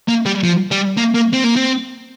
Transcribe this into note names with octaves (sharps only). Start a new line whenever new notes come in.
A#3
G3
F3
G3
A#3
A#3
C4
A#3
C4